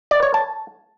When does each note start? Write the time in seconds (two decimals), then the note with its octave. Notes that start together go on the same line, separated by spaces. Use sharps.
0.11 D5
0.23 C#5
0.34 A5